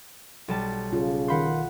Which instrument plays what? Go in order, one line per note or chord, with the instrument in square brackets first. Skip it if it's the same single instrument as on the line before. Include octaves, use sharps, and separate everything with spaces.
[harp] B1 G3 A5
[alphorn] C#3 [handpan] F4
[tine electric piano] D#3 F5 C6 [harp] F#5 B5 G6